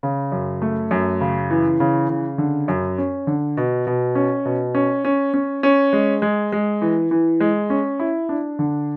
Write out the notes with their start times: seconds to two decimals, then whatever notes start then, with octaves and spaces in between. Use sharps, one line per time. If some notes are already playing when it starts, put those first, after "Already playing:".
0.03 C#3
0.32 F#2
0.62 A3
0.91 F#2
1.21 C#3
1.50 E3
1.80 C#3
2.09 C#3
2.38 D3
2.68 F#2
2.98 C#4
3.27 D3
3.57 B2
3.87 B2
4.15 C#4
4.45 B2
4.75 C#4
5.05 C#4
5.34 C#4
5.63 C#4
5.93 G#3
6.22 G#3
6.52 G#3
6.82 E3
7.11 E3
7.40 G#3
7.70 C#4
8.00 E4
8.29 D4
8.59 D3